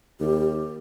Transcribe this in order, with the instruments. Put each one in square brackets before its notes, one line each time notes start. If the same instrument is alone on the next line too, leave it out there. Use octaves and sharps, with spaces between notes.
[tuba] D#2 [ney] G4